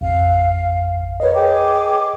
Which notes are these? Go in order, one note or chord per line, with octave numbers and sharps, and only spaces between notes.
A1 F2 F5
A#4 B4 C#5 D#5
G#4 G5 D6